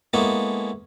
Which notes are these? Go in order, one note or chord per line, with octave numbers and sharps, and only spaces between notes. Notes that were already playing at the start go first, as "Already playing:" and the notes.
G#3 A#3 B3 C#4 E4 A4